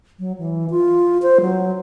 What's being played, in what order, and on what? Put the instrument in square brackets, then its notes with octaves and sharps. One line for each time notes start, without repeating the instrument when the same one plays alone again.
[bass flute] F#3
E3
F4
C5
F#3